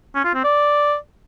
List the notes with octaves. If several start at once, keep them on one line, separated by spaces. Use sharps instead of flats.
C#4
F4
C4
D5